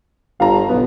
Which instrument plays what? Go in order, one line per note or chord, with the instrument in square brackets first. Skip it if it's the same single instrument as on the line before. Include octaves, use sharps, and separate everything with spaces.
[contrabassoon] G1 [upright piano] F5 A5 A#5
[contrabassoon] B1 [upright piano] B3